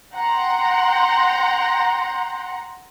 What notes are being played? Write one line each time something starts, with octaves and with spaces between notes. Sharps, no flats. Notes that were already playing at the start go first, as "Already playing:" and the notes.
F#5 G5 A#5 C6